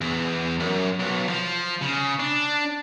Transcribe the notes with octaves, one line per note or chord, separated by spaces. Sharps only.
E2
F#2
B1
F3
C#3
D4